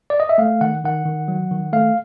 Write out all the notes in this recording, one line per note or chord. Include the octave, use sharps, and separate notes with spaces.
D5
D#5
E5
A3 F5
D#3 F#5
D#3 F#5
D#3
F#3
D#3
A3 F5